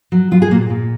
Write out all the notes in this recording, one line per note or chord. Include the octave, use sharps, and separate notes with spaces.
F#3
F#3 F4
G#4
A#2 A#3
A#2